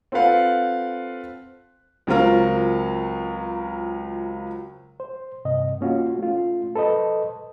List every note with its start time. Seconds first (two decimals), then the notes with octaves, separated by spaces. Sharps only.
0.12 C4 F4 A4 B4 F5 F#5
2.07 C#2 F#3 C4 F4 A#4
5.00 C5
5.45 G2 C3 D#5
5.81 A#3 C#4 F4 F#4
6.18 A3 C#4 F4
6.76 A4 B4 C5 D#5